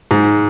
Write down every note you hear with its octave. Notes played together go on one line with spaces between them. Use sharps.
G#2